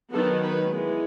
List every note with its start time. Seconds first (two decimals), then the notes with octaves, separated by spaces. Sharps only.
0.13 D#3 F#3 B3 A4
0.43 B4
0.70 E3 G#3 B3